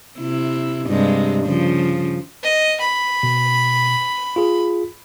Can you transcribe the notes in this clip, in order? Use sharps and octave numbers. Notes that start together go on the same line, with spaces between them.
C3 E4
G2 C3 G#3
C#3 F3
D#5
B5
B2
F4 G#4